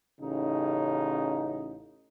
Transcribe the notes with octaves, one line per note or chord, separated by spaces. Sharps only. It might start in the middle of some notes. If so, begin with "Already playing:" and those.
A1 C#3 D#4